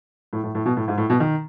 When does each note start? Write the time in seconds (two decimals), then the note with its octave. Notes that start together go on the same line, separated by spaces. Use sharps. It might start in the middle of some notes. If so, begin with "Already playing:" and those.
0.33 A2
0.43 A2
0.55 A2
0.65 B2
0.77 A2
0.88 G#2
0.98 A2
1.10 B2
1.20 D#3